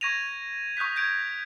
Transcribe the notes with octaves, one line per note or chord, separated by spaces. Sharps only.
C#6 G#6 A#6 D#7 F7
C#6 D#6 F#6 G6 B6
G6 G#6 D7